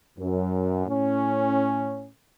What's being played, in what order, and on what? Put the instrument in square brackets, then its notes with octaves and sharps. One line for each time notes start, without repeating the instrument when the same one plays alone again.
[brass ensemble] F#2
A2 C#4